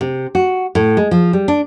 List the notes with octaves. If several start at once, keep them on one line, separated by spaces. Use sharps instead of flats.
C3
F#4
A2
G#3
F3
G3
D4